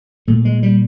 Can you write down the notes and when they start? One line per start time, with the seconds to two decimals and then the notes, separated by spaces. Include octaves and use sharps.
0.28 A#2 A3
0.45 G#3
0.63 G3